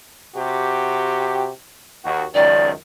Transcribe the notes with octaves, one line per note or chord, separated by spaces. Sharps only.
C3 F#4 G4
D#2 F#4
C#2 F#2 D#3 D5